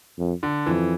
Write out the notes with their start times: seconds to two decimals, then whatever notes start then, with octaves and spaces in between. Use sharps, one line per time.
0.19 F2
0.43 D3
0.66 F2 E3